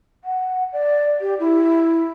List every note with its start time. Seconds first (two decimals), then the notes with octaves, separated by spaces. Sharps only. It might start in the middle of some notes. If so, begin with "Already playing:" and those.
0.24 F#5
0.73 D5
1.21 G4
1.40 E4